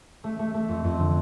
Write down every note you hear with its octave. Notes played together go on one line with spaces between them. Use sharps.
A3
A3
A3
F2
F2
D3